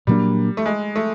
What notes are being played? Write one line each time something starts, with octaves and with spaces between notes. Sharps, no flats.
A#2 F#3 G3 A#3 D4
A3
G#3
A3